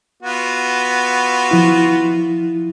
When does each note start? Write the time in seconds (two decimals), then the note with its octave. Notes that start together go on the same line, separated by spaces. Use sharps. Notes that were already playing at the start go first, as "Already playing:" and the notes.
0.23 B3 F4 F#4
1.51 F3 E4